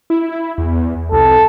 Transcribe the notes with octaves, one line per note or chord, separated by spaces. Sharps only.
E4
E2
C2 A4